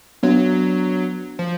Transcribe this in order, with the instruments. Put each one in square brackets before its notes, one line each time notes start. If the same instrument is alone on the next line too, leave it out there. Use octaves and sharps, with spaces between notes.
[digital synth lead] F#3 [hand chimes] B3 D4 F#4
[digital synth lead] F3